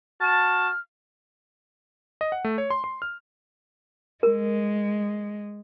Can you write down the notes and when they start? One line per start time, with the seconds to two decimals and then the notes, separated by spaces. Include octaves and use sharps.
0.21 F#4 A5 F6
2.21 D#5
2.32 F#5
2.44 A3
2.58 C#5
2.70 C6
2.84 C6
3.02 F6
4.23 G#3 A#4